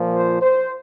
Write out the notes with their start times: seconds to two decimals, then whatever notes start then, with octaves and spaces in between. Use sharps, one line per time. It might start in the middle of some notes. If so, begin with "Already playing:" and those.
Already playing: A#2 F3
0.13 C5
0.42 C5